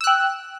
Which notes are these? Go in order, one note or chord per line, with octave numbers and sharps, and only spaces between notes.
G5 E6 F#6